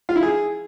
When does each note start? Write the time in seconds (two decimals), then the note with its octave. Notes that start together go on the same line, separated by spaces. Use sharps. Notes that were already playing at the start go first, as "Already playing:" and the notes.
0.09 F4
0.16 E4
0.23 G#4